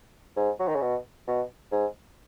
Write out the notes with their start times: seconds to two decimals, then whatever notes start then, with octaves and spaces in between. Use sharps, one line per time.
0.36 G#2
0.59 F#3
0.68 D#3
0.75 C#3
0.81 B2
1.27 B2
1.72 G#2